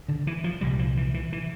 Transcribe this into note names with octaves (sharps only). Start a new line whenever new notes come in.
D3
E3
F3
C2 A#2 G3
F3
E3
E3
E3